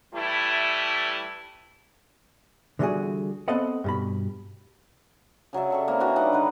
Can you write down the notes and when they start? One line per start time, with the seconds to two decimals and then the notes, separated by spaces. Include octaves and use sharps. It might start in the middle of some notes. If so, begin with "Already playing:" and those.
0.14 E3 G3 A3 E4
2.79 D3 E3 G3 D#4 F#4 G#4
3.48 B3 C4 A4 D#5 F#5
3.84 G2 B2 B5
5.53 C#3 F#3 D5 E5
5.70 G4 A4 C#6
5.88 A#3 C4 E4
6.00 E3 D4 F#4 B4
6.16 G3 C#4 D#4 F#5
6.32 D3 D#3 D#4 B4